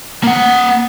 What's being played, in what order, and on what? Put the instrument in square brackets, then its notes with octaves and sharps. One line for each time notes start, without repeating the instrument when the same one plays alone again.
[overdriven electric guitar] A#3 F#5